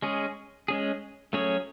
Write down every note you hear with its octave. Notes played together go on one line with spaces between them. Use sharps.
G#3 C#4 G#4
G#3 C#4 G#4
F#3 A3 C#4 G#4 C#5